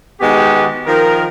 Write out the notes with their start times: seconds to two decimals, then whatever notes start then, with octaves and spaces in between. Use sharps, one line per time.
0.21 D#3 G#3 B3 F#4 G4
0.86 D#3 F3 A#4